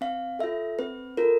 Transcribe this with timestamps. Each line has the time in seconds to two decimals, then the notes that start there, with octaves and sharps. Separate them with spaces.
0.01 C4 F5
0.39 F4 A4 E5
0.79 C4 B4
1.17 F4 A4 A#4